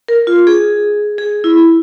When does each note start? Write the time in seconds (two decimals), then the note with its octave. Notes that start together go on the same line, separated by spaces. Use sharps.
0.08 A#4
0.27 F4
0.47 G#4
1.18 G#4
1.44 E4